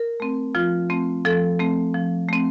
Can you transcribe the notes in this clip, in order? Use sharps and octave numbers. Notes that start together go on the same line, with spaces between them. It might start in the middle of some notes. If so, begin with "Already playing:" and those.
Already playing: A#4
A3 C4
F3 F4
A3 C4
F3 A4
A3 C4
F3
A3 C4